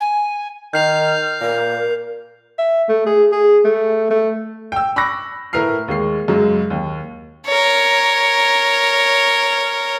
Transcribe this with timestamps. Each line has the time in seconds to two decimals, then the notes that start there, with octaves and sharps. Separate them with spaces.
0.01 G#5
0.73 D#3 F6 G6 C7 F7
1.41 A#2 A#4
2.59 E5
2.89 A3
3.06 G#4
3.32 G#4
3.65 A3
4.11 A3
4.72 G5 E6
4.96 B5 C#6 D6 E6 F#6 A#6
5.53 A2 E4 A#4 B4 F6 C7
5.88 D#2 G#3 C7
6.28 F#2 C#3 F#3 G#3
6.70 D#2
7.46 A#4 C#5